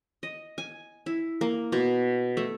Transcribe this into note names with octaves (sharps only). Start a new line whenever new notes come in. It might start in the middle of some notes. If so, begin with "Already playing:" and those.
D#5
G#5
E4
A#3
B2
A3